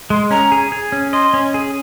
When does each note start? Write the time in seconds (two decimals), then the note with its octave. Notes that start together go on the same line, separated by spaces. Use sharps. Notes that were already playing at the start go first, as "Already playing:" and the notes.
0.10 G#3 C6
0.31 C#4 A#5
0.52 G#4
0.72 G#4
0.92 C#4
1.13 D#5 C6
1.34 C#4
1.54 G#4